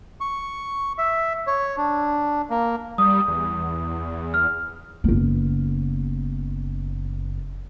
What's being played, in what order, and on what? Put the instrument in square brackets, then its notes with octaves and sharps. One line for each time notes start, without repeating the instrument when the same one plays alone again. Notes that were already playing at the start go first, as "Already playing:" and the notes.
[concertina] C#6
E5
C#5
D4
A#3
[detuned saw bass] G3 [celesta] D#6
[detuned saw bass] E2
[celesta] F6
[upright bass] F#1 B3